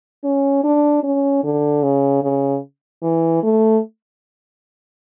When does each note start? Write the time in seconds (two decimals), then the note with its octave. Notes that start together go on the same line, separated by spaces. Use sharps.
0.24 C#4
0.64 D4
1.03 C#4
1.44 D3
1.83 C#3
2.23 C#3
3.02 E3
3.43 A3